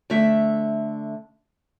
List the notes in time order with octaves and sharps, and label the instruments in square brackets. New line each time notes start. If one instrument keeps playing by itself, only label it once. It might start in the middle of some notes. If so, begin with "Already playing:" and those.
[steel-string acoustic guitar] D3 A3 E5